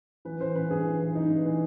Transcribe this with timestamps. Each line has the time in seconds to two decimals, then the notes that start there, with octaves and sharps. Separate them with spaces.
0.25 E3 B4
0.40 E3 C5
0.55 E3 B4
0.70 G2 G#4
0.85 E3
1.00 E3
1.15 E3 D#4
1.30 G2
1.45 E3